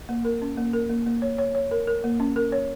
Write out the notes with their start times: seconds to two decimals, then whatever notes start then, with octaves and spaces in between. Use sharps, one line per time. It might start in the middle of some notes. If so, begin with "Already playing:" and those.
0.09 A#3
0.25 A#4
0.42 C#4
0.57 A#3
0.73 A#4
0.90 A#3
1.06 A#3
1.22 C#5
1.38 C#5
1.55 C#5
1.71 A#4
1.87 A#4
2.04 A#3
2.20 C#4
2.36 A#4
2.52 C#5